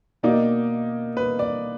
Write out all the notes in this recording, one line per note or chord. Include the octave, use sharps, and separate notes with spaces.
B2 A#3 D#4 D5
B4
D5